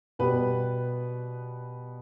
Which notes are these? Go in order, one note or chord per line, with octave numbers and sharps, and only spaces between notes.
B2 G3 B3 B4